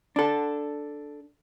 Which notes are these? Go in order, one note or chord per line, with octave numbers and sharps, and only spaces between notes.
D4 A4